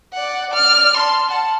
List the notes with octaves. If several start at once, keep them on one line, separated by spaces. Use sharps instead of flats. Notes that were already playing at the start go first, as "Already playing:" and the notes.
D5 F#5
D5 F6
A5 C6
F#5 A5